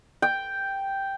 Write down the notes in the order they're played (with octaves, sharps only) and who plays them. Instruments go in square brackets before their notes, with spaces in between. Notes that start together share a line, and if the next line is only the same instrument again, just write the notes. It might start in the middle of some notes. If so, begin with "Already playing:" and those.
[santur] G5